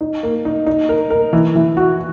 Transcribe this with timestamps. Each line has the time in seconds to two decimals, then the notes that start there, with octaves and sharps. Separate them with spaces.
0.01 D#4
0.23 A#3
0.45 D#4
0.66 D#4
0.89 A#4
1.10 A#4
1.33 E3
1.56 E3
1.77 F#4